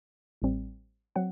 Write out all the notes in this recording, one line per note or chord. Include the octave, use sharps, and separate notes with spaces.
A1 A2 G3 C4
F#3 C4 F#5